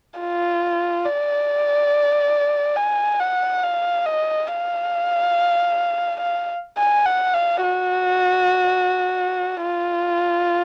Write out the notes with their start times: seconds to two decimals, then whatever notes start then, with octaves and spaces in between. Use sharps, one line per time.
0.19 F4
1.05 D5
2.76 G#5
3.20 F#5
3.63 F5
4.06 D#5
4.48 F5
6.20 F5
6.78 G#5
7.06 F#5
7.34 F5
7.63 F#4
9.63 F4